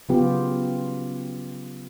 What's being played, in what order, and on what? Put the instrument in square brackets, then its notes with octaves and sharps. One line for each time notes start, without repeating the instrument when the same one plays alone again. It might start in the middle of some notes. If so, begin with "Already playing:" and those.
[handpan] C#3 F#3 B3 F4 G4